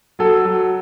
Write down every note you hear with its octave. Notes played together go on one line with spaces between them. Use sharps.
F#3 A4
F#3